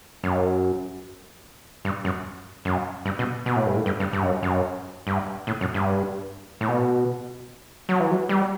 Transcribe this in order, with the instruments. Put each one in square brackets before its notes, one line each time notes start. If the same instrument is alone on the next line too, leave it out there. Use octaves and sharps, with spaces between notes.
[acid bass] F#2
G2
F#2
F#2
G2
B2
B2
A2
G2
A2
G2
G2
G2
F#2
F#2
G2
A2
F#2
G2
A2
B2
F#3
E3
F#3
G3